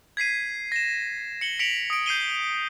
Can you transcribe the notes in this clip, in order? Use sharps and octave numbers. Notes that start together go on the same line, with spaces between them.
G#6 B6 C7 D#7
A#6 E7
C#7 F#7 G7
B6 C#7 D7 F7 F#7
D#6 D7
G6 C7 D#7 G7